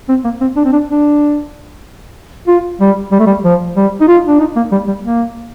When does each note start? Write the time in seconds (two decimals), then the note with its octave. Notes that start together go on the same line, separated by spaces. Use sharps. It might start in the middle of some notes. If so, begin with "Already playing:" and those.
0.09 C4
0.24 A#3
0.41 C4
0.56 D4
0.65 C4
0.72 D4
0.89 D4
2.48 F4
2.81 G3
3.12 G3
3.20 A3
3.26 G3
3.45 F3
3.77 G3
4.01 D#4
4.08 F4
4.28 D4
4.40 D#4
4.56 A#3
4.72 G3
4.88 G3
5.04 A#3